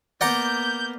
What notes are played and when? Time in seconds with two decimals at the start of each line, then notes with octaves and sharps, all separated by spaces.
0.21 A#3 B3 D5 F#5 A#5 G6